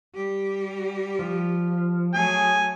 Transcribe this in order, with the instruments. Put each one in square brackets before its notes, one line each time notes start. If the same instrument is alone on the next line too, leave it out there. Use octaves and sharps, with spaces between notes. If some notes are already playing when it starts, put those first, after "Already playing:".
[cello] G3 G4
[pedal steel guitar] F3
[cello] F#3 A3 [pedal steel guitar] G#4 [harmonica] G#5